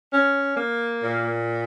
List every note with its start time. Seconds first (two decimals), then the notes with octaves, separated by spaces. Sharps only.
0.13 C#4
0.57 A#3
1.01 A#2